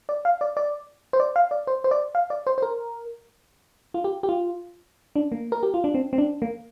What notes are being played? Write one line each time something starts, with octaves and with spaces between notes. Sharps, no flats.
D5
F5
D5
D5
C5
D5
F5
D5
C5
C5
D5
F5
D5
C5
C5
A#4
F4
G4
G4
F4
D4
A#3
A#4
G4
F4
D4
C4
C4
D4
A#3